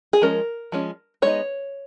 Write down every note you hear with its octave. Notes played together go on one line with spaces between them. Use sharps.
G#4
F3 G#3 C#4 A#4
F3 G#3 C#4
G#3 B3 D#4 C#5